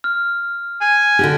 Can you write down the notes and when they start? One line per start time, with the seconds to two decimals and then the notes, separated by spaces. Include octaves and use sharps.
0.04 F6
0.81 G#5
1.19 D3 F#4 G4